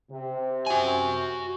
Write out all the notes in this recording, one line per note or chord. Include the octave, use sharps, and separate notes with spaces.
C3
F#4 G#5